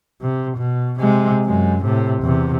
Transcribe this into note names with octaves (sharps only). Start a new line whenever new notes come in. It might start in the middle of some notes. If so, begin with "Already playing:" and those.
C3
B2
C3 G#3
F#2 G#3
A2 C3
E2 C3